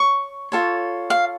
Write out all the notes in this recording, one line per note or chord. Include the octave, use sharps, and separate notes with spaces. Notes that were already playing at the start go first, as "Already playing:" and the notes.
Already playing: C#5 C#6
F4 A4 C#5
F5